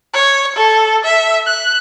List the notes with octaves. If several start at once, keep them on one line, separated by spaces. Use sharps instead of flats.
C#5
A4
E5
F#6